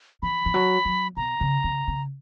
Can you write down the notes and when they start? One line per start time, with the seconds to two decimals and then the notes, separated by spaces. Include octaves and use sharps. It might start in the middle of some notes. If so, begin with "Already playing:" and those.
0.22 E3 B5
0.46 E3
0.54 F#3
0.85 F#3
1.17 B2 A#5
1.41 C#3
1.64 C#3
1.88 C#3